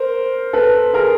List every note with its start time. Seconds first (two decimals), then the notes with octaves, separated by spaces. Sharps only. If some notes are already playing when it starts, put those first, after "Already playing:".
Already playing: A#4 C5
0.53 A4 B4
0.94 G#4 A#4